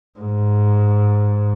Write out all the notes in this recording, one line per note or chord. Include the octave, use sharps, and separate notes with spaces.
G#2